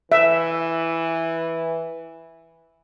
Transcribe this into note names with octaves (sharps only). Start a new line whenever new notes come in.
E3 E5